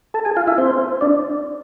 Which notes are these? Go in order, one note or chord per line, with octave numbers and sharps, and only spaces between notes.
A4 A5
G#4 G#5
F4 F5
E4 E5
C4 C5
D4 D5